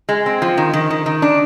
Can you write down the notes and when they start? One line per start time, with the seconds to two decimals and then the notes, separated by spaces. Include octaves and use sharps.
0.09 G#3
0.26 C4
0.42 F3
0.57 D#3
0.73 D#3
0.91 D#3
1.06 D#3
1.22 D4